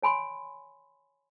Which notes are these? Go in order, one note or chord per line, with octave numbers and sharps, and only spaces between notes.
C#5 G#5 B5 C6